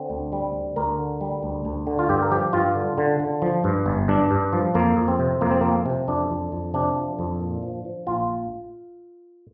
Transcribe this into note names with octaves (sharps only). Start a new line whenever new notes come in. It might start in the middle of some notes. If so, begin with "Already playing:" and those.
Already playing: D3 C4
D2
G3
D2
D2 A#4
D3
G3
D2
D2
D3
F4
G2 G4
A#4
F3 G4
G2 F4
D3
D3
D3
F3
G2
G1
G2 D4
G2
F3
F2 A#3
F2
C4
C3
F2 A#3
C4
F3 A#3
C3
F2 D4
F2
F2
C3 D4
F3
F2
A#2
F3
F3
A#1 F4